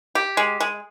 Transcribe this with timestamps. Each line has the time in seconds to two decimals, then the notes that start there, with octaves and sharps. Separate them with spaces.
0.15 G4
0.37 G#3
0.60 G#3